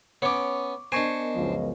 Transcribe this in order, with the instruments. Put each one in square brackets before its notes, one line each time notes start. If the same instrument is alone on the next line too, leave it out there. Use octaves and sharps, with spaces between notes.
[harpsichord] B3 C#4 [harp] C#5 D6
[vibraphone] B3 A#4 D#5 [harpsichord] D4 C5 [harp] G#5 C#6
[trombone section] C#2 F#2 F3